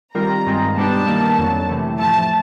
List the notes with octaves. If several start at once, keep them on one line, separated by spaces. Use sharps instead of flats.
D#3 G3 C4 F4 A#4 A#5
G2 D#3 G#3 C4 F4
B2 G3 B3 D4 G4 A5
D#3 G3 A#3
F2 D3 F#3
C3 E3 A3
A2 F3 A3 A5